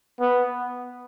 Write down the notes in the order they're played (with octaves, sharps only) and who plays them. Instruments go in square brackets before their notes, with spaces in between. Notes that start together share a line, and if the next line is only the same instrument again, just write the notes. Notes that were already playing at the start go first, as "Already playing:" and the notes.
[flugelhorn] B3